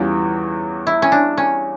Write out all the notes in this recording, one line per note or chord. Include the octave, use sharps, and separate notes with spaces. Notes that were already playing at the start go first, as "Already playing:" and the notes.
Already playing: E2 E3 G3 C#4 F4
E4
C#4
D4
C#4